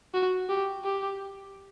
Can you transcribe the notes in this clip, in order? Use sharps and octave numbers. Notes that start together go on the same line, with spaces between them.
F#4
G4
G4